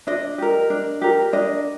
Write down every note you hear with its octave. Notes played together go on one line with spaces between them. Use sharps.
D4 D#5
G4 A#4
D4
G4 A#4
D4 D#5